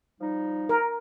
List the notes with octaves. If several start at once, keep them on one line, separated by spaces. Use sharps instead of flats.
F3 G3 D#4
A#4